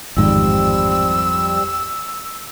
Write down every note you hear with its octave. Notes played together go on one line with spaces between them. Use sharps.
A1 F2 G#2 D#3 G3 C4 G5 E6